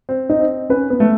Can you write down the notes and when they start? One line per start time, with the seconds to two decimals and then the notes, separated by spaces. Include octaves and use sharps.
0.09 C4
0.30 D#4
0.39 C4
0.69 C#4 B4
0.90 B3
1.00 A3